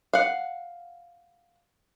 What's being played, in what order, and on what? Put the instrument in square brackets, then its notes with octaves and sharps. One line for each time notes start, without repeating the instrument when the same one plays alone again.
[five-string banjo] F5 F#5